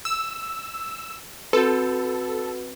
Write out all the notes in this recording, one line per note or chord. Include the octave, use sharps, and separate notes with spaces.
E6
C4 F#4 A4 B4 A5